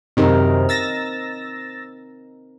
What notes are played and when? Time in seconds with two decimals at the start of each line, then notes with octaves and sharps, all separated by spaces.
0.17 F#2 C3 D#3 C4 D#4 A#4
0.69 E6 A6 A#6